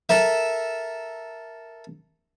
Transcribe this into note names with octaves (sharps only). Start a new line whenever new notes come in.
A4 A#4 E5